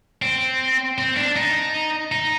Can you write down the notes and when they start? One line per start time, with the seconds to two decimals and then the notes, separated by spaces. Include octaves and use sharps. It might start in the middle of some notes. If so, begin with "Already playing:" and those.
0.22 C4
0.98 C4
1.17 D4
1.36 D#4
2.12 D#4